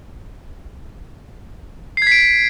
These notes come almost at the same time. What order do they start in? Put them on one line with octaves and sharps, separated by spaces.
C7 G#6 B6 D7